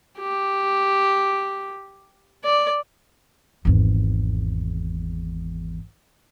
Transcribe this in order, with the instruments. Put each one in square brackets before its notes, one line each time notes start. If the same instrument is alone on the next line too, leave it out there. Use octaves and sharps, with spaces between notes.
[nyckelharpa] G4
D5
[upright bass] G#1 E2